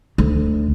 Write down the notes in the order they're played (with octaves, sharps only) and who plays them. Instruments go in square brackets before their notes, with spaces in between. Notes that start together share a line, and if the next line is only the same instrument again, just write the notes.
[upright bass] D2